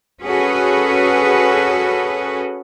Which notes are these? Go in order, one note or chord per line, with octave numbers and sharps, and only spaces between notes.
C#4 F#4 G#4 A4 B4